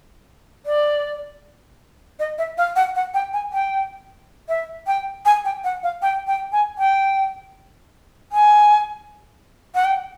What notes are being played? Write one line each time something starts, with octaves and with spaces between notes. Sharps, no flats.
D5
D#5
E5
F5
F#5
F#5
G5
G#5
G5
E5
G5
G#5
G5
F#5
F5
G5
G5
G#5
G5
G#5
F#5
G5